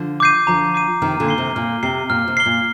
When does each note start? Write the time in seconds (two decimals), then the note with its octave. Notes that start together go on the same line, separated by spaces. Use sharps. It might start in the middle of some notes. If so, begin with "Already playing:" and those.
Already playing: D3 F3
0.20 D6 G6 C7 D#7
0.47 D3 F3 A#5
0.74 D6 G6 C7 D#7
1.02 C3 D#3 F6
1.20 A#2 D3
1.28 C7 G7
1.38 C3
1.55 A#2 F6
1.83 C3 C7 G7
2.10 A#2 F6
2.28 C3
2.37 C7 G7
2.46 A#2